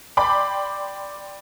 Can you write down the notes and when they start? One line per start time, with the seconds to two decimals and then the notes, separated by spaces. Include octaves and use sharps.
0.17 D5 G5 B5 C6 D6